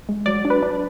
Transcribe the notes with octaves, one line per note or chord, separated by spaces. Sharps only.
G#3
F#3 D5
D4
B4
D4